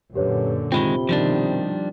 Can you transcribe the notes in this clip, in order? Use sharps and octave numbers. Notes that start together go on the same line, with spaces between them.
F#2 A#2 D3 G4 B4 C#5
C3 D#3 G#3 C4 F4 B5 G7
B2 D#3 F3 G3 D4